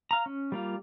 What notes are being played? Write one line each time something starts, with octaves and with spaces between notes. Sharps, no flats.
F5 A#5
C#4
G3 A#3 F4